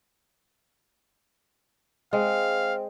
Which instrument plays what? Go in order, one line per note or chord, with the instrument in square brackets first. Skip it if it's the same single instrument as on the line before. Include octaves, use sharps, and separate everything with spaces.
[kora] G#3 [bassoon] C4 [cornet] F5